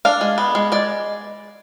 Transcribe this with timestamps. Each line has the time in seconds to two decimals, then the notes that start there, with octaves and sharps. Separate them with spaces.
0.05 D4 F5
0.21 G#3
0.38 B3
0.55 G#3
0.72 G#3 D5